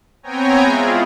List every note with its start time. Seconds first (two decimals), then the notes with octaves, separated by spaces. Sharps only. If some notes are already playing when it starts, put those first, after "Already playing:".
0.23 B3 C4 C#5 G5 G#5 A#5
0.63 G#3 E4 F4 G#4